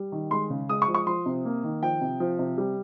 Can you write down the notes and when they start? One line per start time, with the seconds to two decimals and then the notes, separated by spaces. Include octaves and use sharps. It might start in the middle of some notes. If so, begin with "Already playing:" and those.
Already playing: G3
0.12 D#3
0.31 G#3 C6
0.50 C#3
0.69 G#3 D#6
0.82 C#6
0.88 F3
0.94 C#6
1.07 F3 C6
1.26 C3
1.45 A#3
1.64 D#3
1.82 F3 G5
2.01 C3
2.20 F3
2.39 C3
2.58 G3